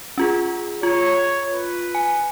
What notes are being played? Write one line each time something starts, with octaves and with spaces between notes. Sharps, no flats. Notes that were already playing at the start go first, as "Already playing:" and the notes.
C#4 F4 G#4
F4 C#5
B4
G#5